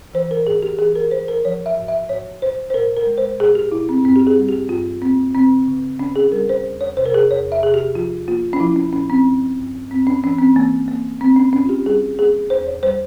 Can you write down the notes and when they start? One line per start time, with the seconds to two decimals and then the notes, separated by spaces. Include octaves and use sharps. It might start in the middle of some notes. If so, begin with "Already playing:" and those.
0.14 E3 C5
0.31 A#4
0.46 G#2 G#4
0.63 G4
0.79 E3 G#4
0.96 A#4
1.11 E3 C5
1.28 A#4
1.44 F3 C#5
1.66 E5
1.77 G#2
1.88 E5
2.09 G#2 C#5
2.42 G#2 C5
2.70 C5
2.74 A#2 A#4
2.97 A#4
3.06 G#3
3.18 C5
3.40 A#2 G#4
3.55 G4
3.72 A#2 E4
3.89 C4
4.04 G2 C4
4.16 G4
4.27 G#4
4.38 G3
4.49 G4
4.69 G2 F4
5.02 A#3 C4
5.35 C#3 C4
5.68 C#3
5.99 C#3 C#4
6.16 G#4
6.32 G3 A#4
6.49 C5
6.64 E2
6.81 C#5
6.97 C3 C5
7.06 A#4
7.14 G#4
7.31 E2 C#5
7.52 E5
7.63 C3 G#4
7.74 G4
7.95 F3 F4
8.28 A#3 F4
8.53 C#4
8.60 F3 E4
8.76 C#4
8.92 A#2 C#4
9.10 C4
9.25 G2
9.58 G2
9.90 G2 C4
10.07 C#4
10.23 E3 C#4
10.39 C4
10.56 E3 A#3
10.88 A#3
11.21 G#2 C4
11.36 C#4
11.53 G#2 C#4
11.65 F4
11.69 G4
11.86 G3 G#4
12.18 A#3 G#4
12.50 E2 C5
12.67 C#5
12.83 G3 C5